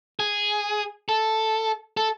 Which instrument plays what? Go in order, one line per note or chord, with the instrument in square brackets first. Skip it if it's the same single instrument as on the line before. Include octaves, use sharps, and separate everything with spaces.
[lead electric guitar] G#4
A4
A4